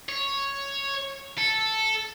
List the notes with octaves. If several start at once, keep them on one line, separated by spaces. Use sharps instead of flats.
C#5
A4